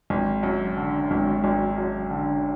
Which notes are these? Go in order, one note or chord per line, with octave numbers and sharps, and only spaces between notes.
G#1
F#2
D3
G#1
G#1
F#2
D3